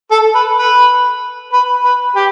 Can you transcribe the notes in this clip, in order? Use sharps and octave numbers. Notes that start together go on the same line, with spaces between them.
A4
B4
B4
B4
B4
G4